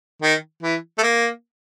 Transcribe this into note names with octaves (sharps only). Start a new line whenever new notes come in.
D#3
E3
A3
A#3